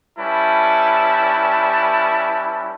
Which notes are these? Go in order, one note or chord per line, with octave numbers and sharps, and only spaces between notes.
G3 C#4 E4 B4 A5